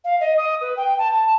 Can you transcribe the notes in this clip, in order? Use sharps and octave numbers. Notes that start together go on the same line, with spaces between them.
F5
D#5
D#6
B4
G5
A5
A5